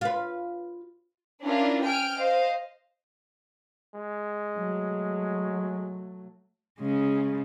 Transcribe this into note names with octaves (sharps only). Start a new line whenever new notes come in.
F4 B4
C#4 D4 E4 F4 A#4
G5 G#5 F6 D7
C5 D#5 F5
G#3
F#3 A3
C#3 G#3